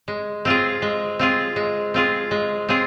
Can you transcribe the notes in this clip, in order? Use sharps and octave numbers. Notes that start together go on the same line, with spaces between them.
G#3
C4 F4 G#4
G#3
C4 F4 G#4
G#3
C4 F4 G#4
G#3
C4 F4 G#4